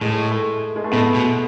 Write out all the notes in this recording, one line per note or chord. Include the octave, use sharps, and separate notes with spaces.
A2 G#3
A3
G#3
A3
A2 B3
B2